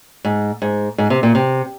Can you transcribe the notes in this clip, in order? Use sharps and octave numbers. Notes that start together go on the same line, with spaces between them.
G#2
G#2
G#2
C3
A#2
C3